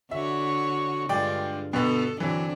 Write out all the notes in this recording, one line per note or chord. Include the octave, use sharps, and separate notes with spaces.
D3 F#4 C#5 E5
G2 D3 G#3 F4 D5 G5
B2 D3 B3 A4
D3 E3 F#3 C4 D4